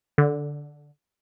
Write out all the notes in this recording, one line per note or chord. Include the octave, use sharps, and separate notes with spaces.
D3